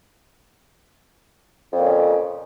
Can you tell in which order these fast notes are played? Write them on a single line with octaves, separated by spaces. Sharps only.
F2 A#2 C#3